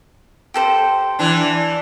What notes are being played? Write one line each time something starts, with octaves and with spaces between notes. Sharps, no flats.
G4 A4 C5
E3 D4